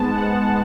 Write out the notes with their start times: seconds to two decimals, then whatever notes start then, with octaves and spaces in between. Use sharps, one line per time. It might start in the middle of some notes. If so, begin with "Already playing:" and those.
Already playing: G#2 G#3 B3 A5
0.13 F#5